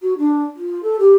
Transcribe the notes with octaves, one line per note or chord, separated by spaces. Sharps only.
F#4
D4
F4
A4
G4